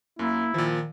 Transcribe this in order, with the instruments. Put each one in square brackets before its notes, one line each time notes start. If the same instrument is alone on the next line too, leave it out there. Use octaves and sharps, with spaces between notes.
[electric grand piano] F#2 [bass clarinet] A#3 [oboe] E4
[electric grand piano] A#2 F3 [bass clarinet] D#3